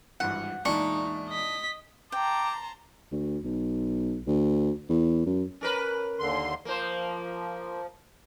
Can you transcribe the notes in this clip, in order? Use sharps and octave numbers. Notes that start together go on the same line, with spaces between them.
G#1 G2 E3 F#5
E2 A#2 G#3 D4 D#4 C#6
D#5 B6
G5 A5 A#5 C6 D6
D2
B1
D2
E2
F#2
C#4 A#4 B4
D#2 D3 C6
F3 A#3 C5